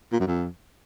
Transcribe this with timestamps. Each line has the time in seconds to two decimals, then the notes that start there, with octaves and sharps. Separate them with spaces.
0.13 A#2
0.20 F#2
0.27 F2